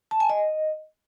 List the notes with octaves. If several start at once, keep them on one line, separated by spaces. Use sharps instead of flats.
A5
G#5
D#5